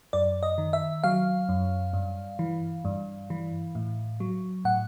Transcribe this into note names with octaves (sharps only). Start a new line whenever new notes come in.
F#2 D5
D#5
D#3
E5
F#3 F5
F#2
G2
E3
G2
E3
A2
F#3
A2 F#5